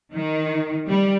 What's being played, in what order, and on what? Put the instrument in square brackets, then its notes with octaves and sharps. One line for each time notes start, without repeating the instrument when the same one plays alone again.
[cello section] D#3
G3